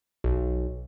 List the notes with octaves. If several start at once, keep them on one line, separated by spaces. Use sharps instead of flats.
B1